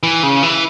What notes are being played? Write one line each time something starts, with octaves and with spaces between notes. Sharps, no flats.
E3
C#3
E3